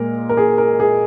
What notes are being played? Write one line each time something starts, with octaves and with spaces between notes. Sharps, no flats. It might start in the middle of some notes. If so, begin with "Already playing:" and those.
Already playing: A#2 G#3 A#4
A#4
G#4
A#4
G#4